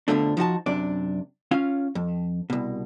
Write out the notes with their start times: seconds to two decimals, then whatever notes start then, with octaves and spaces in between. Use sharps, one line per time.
0.08 F2 B2 D3 F3 A3 D4
0.37 F3 D#4 F#4 A5
0.66 F#2 C3 D4 D5
1.51 C#4 F4 F5
1.95 F2
2.50 C2 B2